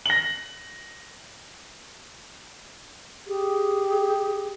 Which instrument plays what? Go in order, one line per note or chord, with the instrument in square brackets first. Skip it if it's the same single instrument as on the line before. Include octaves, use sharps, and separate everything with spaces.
[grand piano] A#6 F#7
[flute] G4 [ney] G#4